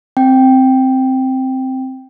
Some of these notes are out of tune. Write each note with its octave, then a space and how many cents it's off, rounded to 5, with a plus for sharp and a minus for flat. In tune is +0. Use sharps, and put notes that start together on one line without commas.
C4 +0 G5 +0